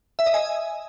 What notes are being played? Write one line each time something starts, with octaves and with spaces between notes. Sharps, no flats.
E5
D#5
G#5